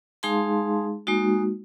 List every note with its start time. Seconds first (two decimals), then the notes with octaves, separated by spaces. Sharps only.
0.23 G#3 D#4 G#4 F5 A5 C6
1.07 G#3 A#3 D#4 F#4